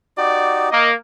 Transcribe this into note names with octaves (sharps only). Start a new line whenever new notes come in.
D#4 F#4 G4 D5
A#3 D#5